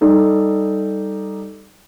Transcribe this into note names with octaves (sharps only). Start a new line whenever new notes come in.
G3 D#4 A4